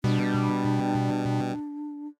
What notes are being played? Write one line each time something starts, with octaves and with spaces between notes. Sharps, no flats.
B2 G3 D4